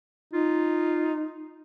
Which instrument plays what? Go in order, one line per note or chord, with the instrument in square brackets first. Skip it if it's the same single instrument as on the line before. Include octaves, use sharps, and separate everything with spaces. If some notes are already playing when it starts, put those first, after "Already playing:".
[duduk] D#4 [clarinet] F4